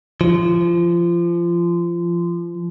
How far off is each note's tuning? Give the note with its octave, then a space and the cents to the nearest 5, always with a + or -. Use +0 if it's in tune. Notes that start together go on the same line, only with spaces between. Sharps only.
F3 -25